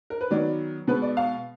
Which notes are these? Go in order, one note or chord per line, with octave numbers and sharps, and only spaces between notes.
A#4
B4
D#3 F#3 B3 D5
B2 G#3 B3 B4
D5
F5